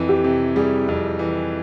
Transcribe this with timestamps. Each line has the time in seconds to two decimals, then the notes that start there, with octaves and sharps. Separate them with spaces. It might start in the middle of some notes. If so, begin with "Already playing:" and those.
Already playing: F2 E3
0.09 G4
0.24 C3
0.56 G3 G#4
0.88 F2
1.19 E3